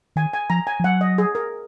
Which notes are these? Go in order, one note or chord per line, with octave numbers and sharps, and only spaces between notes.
D#3 G#5
G#5
F3 A#5
G#5
F3
F#3 F#5
D#5
G#4
A#4